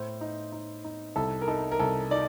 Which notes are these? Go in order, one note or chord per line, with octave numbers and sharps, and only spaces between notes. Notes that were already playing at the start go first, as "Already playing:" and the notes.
Already playing: A2 C5
D#4
D#4
D#4
C2 A4
A#4
D#4 A4
A#4
C2 A4
D#4 D5